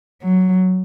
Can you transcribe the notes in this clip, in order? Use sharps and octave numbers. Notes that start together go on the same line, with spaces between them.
F#3